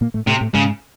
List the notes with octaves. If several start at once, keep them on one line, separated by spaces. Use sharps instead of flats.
A#2 A#3
A2 A3
A2 C3 A3
A2 A3
G#2 C#3 G#3